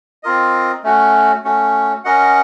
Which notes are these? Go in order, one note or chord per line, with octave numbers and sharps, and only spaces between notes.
C4 F4 A#4 D#5
A3 C#4 F#4
A3 C#4 F#4
C#4 F#4 A#4 D#5 F#5